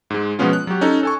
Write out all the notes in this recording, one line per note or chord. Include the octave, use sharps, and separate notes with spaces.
G#2 G#3
B2 F3 G#3 B3 C#4 F4
F#6
F#3 F#4 G4
C#4 D#4 A4
A4 G#5 C#6